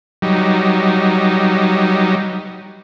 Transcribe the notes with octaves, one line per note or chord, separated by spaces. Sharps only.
F#3 G3 D#4